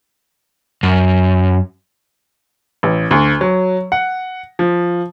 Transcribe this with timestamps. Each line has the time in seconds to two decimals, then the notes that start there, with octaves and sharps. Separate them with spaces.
0.83 F#2
2.83 A1
3.11 D2
3.41 F#3
3.92 F#5
4.59 F3